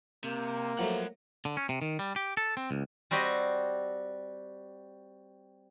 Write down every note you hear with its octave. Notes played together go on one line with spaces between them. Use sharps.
C3 A#3
F3 F#3 A3 A#4 F#5
D3
C#4
C3
D#3
G3
G4
A4
C4
C#2
G3 C4 F#4 G4 D#5